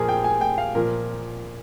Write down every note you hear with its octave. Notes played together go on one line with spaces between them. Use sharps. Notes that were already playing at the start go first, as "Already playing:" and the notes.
Already playing: A#2 F3 G#4 A#4
G5
G#5
G5
F5
A#2 F3 A#4